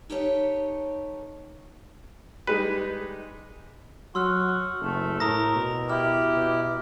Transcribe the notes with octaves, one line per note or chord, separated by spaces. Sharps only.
D#4 G4 A4 B4 C#5
G3 G#3 D#4 B4
F#3 F#4 C6 E6 F6
F#1 A3
A2 A#4 A#5 D#6 A#6
B2
E4 G4 F6
B2